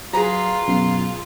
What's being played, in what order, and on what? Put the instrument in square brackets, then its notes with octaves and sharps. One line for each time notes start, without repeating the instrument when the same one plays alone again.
[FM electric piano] F#3 [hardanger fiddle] F4 [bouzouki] G#4 B4 A#5
[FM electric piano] F#2 B2 C7